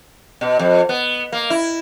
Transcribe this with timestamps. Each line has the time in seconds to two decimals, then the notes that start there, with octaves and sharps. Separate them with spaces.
0.41 B2
0.59 F2
0.89 B3
1.32 A#3
1.50 E4